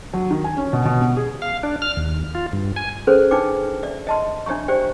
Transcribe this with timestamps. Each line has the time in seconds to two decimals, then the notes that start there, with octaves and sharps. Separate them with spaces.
0.14 F#3
0.31 D#3
0.44 G#5
0.57 C#4
0.73 B2
0.85 B2
1.01 B3
1.17 G#4
1.42 F5
1.63 D4
1.82 F6
1.97 D#2
2.35 F4
2.53 G2
2.76 G#5
3.07 C#4 G#4 A4 B4 C5
3.31 D4 D#4 B4 G5 D6
3.83 D5 E5
4.07 D#5 A5 C6
4.46 D4 C#5 E5 A#5 C#6
4.68 G4 C5 D5 G5